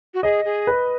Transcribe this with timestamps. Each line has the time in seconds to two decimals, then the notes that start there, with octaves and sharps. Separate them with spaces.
0.14 F#4
0.23 G#4 D#5
0.45 G#4
0.67 B4